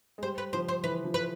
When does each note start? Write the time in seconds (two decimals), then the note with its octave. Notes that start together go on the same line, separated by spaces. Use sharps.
0.18 G#3
0.23 G3 C5
0.38 B4
0.53 F3 C5
0.68 C5
0.84 E3 B4
1.04 F3
1.14 B4